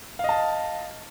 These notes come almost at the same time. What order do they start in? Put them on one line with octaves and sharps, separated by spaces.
F5 D#5 A5